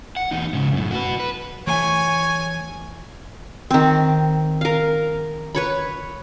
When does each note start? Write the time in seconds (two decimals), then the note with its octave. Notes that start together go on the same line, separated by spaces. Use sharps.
0.16 F#5
0.31 E2 D#4
0.53 G#2 C#3
0.72 F#2 A2
0.91 F#4 B4
1.20 B4
1.67 E3 A3 C#5 G#5
3.71 D#3 C4
4.61 A#4 F5
5.55 B4 C#5 B5